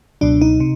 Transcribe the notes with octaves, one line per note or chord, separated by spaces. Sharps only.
C#2 B2 F#3 D4
D#4
C3